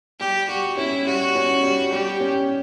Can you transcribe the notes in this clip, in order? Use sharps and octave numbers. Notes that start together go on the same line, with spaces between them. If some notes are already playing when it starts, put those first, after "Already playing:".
G3 G4
G3 F#4
C#4 E4
G3 F#4
C#4
G3
G3 G4
C#4